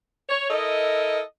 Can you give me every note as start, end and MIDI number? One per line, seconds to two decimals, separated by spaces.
0.29 0.46 73
0.50 1.20 64
0.50 1.20 69
0.50 1.20 70
0.50 1.20 75